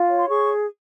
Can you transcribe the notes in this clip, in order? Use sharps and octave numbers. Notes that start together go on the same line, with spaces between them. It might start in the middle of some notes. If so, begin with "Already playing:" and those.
Already playing: F4
C#5
C6
G#4 C#6